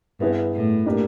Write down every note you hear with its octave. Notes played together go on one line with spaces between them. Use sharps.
G2 B3 E4 G#4 B4
A2
A#3 D4 G4 A#4